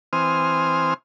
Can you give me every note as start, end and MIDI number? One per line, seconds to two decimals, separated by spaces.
0.13 0.94 52
0.13 0.94 60
0.13 0.94 72
0.13 0.94 80
0.13 0.94 87
0.13 0.94 89